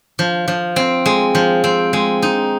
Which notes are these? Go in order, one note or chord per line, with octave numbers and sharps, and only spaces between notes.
F3
F3
C4
G#3
F3
C4
G#3
D#4